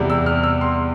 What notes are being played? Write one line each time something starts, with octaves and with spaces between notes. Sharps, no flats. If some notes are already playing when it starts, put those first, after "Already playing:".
Already playing: E2 C3 G3
E6
F6
E6
C6